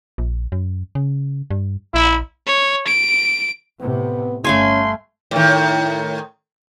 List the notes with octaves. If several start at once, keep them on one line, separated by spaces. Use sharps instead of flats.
A#1
F#2
C#3
G2
A#1 E4
C#5
D7
A2 C3 B3
G1 A3 C#4 F5 G#5 C6
A2 D#3